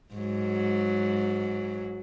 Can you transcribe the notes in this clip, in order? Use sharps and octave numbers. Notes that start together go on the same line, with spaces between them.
G#2 F#3